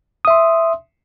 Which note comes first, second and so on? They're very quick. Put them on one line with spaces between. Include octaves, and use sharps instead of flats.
D#6 E5 C6